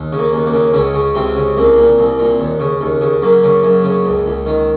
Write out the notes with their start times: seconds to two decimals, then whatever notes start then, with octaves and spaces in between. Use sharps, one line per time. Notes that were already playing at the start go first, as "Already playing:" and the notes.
Already playing: D#2
0.13 C#3
0.18 A#3
0.33 D#2
0.46 A#3
0.54 C#3
0.74 C#2 C#3 C#4
0.94 C#3
1.15 C#2 C3 C4
1.36 C#3
1.57 C2 A#3
1.78 A#2
1.99 C2
2.19 A#2
2.40 D#2
2.60 C#3
2.81 D#2
3.01 C#3
3.22 F#2 A#3
3.44 C#3
3.64 F#2
3.84 C#3
4.06 C#2
4.26 C#2
4.46 D#3